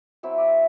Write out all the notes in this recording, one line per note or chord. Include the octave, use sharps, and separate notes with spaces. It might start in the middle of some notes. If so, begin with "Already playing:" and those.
F#3 C4 E4 E5
D5